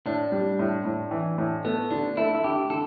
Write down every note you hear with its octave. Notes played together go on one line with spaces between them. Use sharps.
A2 D4
G3
A2
A2
E3
A2
A3 B3
D3 D4
A3 E4
E4
D3 G4
D3 A4